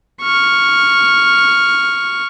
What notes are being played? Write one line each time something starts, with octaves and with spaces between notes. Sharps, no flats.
C#6 F6